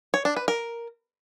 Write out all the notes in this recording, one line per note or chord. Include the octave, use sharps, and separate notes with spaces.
C#5
D4
B4
A#4